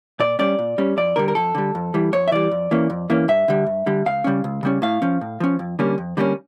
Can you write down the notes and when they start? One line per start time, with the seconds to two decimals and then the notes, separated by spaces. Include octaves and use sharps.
0.20 A#2 D5
0.39 G3 C#4 D5
0.59 A#2
0.78 G3 C#4
0.97 F2 D5
1.16 D3 G3 A#4
1.28 A#4
1.35 F2 A4
1.55 D3 G3
1.75 F2
1.94 E3 G3
2.13 F2 C#5
2.28 E5
2.31 E3 G3 D5
2.51 F2
2.71 E3 A#3 C#4
2.90 F2
3.10 E3 A#3 C#4
3.28 G2 E5
3.48 D3 G3
3.66 G2
3.86 D3 G3
4.06 C#2 F5
4.24 C#3 G3 C#4
4.44 C#2
4.63 C#3 G3 C#4
4.82 A2 F5
5.02 F3 C#4
5.21 A2
5.40 F3 C#4
5.59 F2
5.79 D3 G3 A#3 C#4
5.98 F2
6.17 D3 G3 A#3 C#4